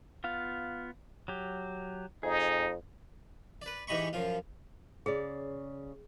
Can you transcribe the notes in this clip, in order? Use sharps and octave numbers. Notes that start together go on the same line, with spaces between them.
B3 F4 F5
F#3 G4
F2 D#4 G#4
B4 D5
G#2 E3 G4 D#5 B5 C#6
F#2 F3 F4
C#3 G#4 C#5 D5